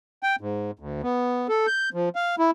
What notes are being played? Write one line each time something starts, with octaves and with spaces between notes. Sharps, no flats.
G5
G#2
D2
B3
A4
G6
F3
F5
E4